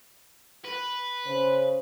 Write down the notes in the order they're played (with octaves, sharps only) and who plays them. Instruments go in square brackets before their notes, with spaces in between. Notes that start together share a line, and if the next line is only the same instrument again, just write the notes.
[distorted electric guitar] B4
[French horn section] C#3 C5